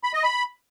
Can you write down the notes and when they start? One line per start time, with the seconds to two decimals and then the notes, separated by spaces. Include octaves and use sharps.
0.03 B5
0.14 D#5
0.24 B5